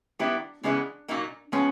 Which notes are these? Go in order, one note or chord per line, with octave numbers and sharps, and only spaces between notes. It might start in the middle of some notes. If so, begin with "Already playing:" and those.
D#3 G3 B3 D4 E4 G4
C#3 E3 G#3 B3 D4 E4
A#2 F#3 A#3 D#4
F3 G#3 B3 C#4